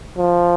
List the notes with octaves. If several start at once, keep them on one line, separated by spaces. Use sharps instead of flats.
F3